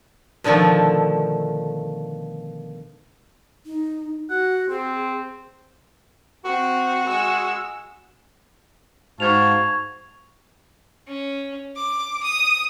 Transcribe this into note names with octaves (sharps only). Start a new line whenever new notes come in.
B2 D3 D#3 F3 A3
D#4
F#4 F#5
C4 G#4
C4 F#4
G#3 E6
G#2 F#4 F5 A5 C#6 G#6 F7
C#4
D6
D#6